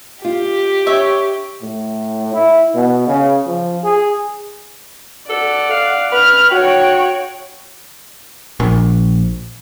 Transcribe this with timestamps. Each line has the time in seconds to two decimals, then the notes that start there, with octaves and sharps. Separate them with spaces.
0.25 F4 G4
0.87 D4 C#5 E5
1.62 A2
2.34 E4
2.74 B2
3.07 C#3
3.46 F3
3.84 G#4
5.30 A4 D5 F#5
5.70 F5
6.12 B4 F6
6.51 F#4 C#5 G5
8.60 A#1